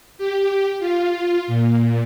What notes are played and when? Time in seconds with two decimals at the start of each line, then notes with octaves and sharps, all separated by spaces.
0.18 G4
0.79 F4
1.47 A#2